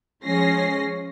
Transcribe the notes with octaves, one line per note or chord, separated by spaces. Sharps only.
F3 G#3 C#4 A#6 C7